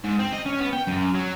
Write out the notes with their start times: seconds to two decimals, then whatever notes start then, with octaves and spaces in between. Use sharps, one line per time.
0.04 G#2
0.19 C4
0.33 D#5
0.46 C#4
0.60 B3
0.73 G5
0.87 F#2
1.15 F#3